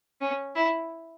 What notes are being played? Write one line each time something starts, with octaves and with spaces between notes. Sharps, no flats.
C#4
E4